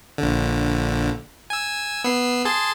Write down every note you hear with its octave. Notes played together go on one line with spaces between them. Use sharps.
A#1 D3
G#5 E6
B3 E6 C7
G#4 A5 C6